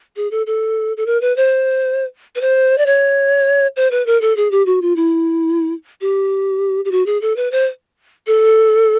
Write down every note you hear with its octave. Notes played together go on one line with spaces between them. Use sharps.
G#4
A4
A4
A4
A#4
B4
C5
B4
C5
D5
C#5
C5
B4
A#4
A4
G#4
G4
F#4
F4
E4
G4
G4
F#4
G#4
A4
B4
C5
A4